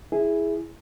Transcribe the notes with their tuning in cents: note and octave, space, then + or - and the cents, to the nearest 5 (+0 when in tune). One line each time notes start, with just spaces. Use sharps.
E4 +0 G#4 +0